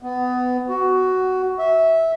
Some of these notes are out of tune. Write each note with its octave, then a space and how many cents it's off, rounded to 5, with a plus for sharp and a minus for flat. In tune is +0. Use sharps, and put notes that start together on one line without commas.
B3 +20
F#4 +10
E5 -15